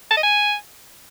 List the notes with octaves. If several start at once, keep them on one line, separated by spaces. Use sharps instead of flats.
A5
D#5
G#5